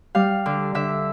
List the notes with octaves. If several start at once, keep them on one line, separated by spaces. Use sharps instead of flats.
G3 F5
D3
D3 E5